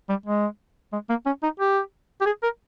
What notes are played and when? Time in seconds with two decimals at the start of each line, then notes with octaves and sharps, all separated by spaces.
0.09 G3
0.26 G#3
0.93 G#3
1.10 A#3
1.26 C#4
1.43 D#4
1.60 G4
2.21 G4
2.26 G#4
2.43 A#4